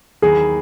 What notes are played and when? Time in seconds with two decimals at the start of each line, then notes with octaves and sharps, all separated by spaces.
0.22 D#2 D#3 F#3 B3 E4 G#4